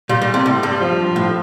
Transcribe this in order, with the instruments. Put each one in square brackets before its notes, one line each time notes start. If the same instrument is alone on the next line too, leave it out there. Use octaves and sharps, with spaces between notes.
[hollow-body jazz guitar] A#2 [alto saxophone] G3
[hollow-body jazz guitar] A#2
C3
A2
G2
[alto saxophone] G3
F3
[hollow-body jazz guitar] A2